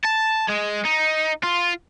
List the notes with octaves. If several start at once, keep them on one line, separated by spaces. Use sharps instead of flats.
A5
G#3
D#4
F4